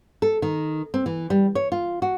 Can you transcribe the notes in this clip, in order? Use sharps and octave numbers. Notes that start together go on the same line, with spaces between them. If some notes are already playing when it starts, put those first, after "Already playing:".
A4
D#3
C4
E3
G3
C#5
F4
F#4